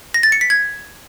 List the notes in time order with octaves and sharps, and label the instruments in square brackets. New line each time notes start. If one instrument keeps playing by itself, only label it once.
[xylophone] A#6
A6
C#7
B6
G#6